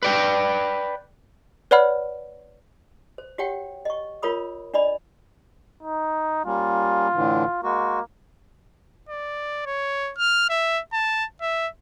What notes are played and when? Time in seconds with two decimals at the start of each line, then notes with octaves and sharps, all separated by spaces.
0.03 B4 D5 G5
1.71 B4 C#5 D5 F#5 B5 F6
3.18 C5
3.38 F#4 G4 C#5 F#5 G5
3.85 D#5 C#6
4.22 F4 A#4 C#5 B5 D#6
4.74 D4 D5 D#5 B5
5.83 D#4
6.45 G3 A#3 C#4 F4
7.14 A2 D3 E3
7.63 G#3 A#3 F#4
9.09 D5
9.66 C#5
10.17 F6
10.50 E5
10.93 A5
11.41 E5